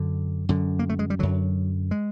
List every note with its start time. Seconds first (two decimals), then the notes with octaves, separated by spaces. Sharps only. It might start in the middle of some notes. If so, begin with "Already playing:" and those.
Already playing: F#2 D3
0.49 F#2 D3
0.79 A#3
0.89 A3
0.99 G#3
1.10 G3
1.19 F#2 D3 F#3
1.91 G#3